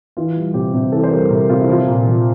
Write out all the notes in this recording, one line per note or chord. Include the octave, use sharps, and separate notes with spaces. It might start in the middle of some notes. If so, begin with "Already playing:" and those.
E3 F4
G3
C3 G4
C3
E3 A4
C5
G3 A#4
C3 A#4
C3 F4
E4
F3 F4
A#2
F3